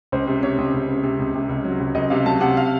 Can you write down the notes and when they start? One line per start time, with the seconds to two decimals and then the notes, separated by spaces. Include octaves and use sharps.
0.12 C#2 C5
0.27 C3
0.43 C3 C#5
0.58 C#2
0.74 C#2
0.88 C#2
1.03 C3
1.19 C#2
1.35 C3
1.49 C#2
1.65 F#3
1.80 C#2
1.95 C#2 D#5
2.10 C3 F5
2.26 F#3 A5
2.41 C3 F#5
2.57 F5